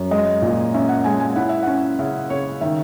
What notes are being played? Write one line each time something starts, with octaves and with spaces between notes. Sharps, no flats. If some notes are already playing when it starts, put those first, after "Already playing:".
Already playing: F#2
G#3 D#5
A#2
C#4 E5
F#5
G#3 G#5
G#5
E4 F#5
E5
C#4 F#5
C#3 E5
C#3 C#5
D#3 E5